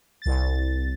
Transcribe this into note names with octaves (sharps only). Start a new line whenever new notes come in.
C2 A6